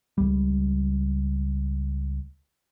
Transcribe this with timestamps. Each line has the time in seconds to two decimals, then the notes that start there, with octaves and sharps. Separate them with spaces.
0.18 C#2 G3